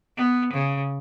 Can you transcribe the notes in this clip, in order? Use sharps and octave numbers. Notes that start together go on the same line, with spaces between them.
B3
C#3